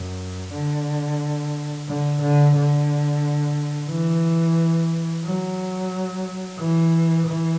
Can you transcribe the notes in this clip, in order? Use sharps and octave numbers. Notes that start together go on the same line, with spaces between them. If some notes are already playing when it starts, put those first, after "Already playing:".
Already playing: F#2
D3
D3
D3
D3
E3
F#3
E3
E3